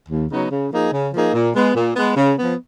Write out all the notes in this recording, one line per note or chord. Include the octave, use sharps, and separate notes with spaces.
D#2
C#3 F#3 B3 D#4
C#3
F3 A#3 D#4 G#4
C#3
F3 A#3 D#4 G#4
A#2
G#3 B3
A#2
G#3 B3
C#3
F3 B3